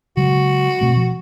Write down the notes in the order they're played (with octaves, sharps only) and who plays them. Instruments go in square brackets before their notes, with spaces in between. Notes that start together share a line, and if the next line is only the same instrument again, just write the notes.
[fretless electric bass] C#3 F#3 G#3 [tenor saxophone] F#4
[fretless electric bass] B2 A3 C4
F3